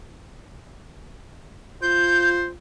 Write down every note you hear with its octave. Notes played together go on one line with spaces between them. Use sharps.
F4 C5 G6